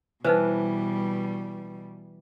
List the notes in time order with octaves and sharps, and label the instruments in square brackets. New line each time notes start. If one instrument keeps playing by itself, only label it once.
[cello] B2 G3 [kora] E3 [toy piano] D#4 B4 C5